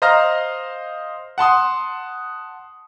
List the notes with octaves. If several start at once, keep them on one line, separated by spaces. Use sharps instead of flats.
C5 D#5 F5 A#5 F6 A#6
F#5 A5 C6 D#6